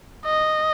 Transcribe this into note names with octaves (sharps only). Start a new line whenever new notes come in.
D#5